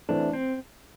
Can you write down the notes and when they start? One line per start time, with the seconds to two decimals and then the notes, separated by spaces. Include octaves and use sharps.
0.09 E3 A3 C4 D4 E4
0.33 C4